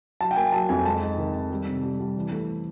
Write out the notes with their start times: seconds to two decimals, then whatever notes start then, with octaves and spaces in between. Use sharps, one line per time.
0.21 F#3 A5
0.31 G5
0.36 A#3 G#5
0.52 F#3 A5
0.69 F2 G#5
0.85 G#3 A5
1.02 D#4
1.18 D#3
1.34 D#3
1.50 G3
1.67 C3
1.83 G3
2.00 G3
2.16 E3
2.32 A3